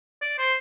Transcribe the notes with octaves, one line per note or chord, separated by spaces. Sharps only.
D5
C5